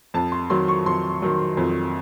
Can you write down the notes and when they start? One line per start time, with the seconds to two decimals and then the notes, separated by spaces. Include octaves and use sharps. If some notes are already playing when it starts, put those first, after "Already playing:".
0.14 F2 A5
0.32 C6
0.50 D#3 F#3 C6
0.68 C#6
0.86 F2 C6
1.22 D#3 F#3
1.57 F2